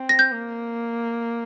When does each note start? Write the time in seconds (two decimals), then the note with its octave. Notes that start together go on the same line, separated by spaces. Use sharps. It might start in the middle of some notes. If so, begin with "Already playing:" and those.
Already playing: C4
0.09 A#6
0.19 G6
0.32 A#3